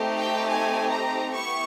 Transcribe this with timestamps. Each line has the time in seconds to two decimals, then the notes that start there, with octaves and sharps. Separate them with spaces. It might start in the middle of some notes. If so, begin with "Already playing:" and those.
Already playing: A3 C4 D#4 G4
0.20 G5
0.48 G#5
0.91 A#5
1.33 B3 E4 G4 C#6